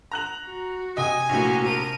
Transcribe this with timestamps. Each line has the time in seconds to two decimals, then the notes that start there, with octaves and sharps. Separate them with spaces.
0.12 A#5 F#6 F#7
0.45 F#4
0.97 C3 D#5 G#5 D#6
1.29 A#1 A2 A#3 F#4
1.66 A#4 A5 D#7